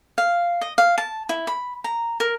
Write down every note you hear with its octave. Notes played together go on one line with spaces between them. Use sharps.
F5
D#5
F5
A5
E4
B5
A#5
A#4